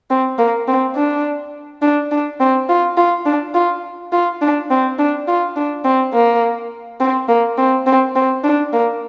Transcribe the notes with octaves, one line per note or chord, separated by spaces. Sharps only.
C4
A#3
C4
D4
D4
D4
C4
F4
F4
D4
F4
F4
D4
C4
D4
F4
D4
C4
A#3
C4
A#3
C4
C4
C4
D4
A#3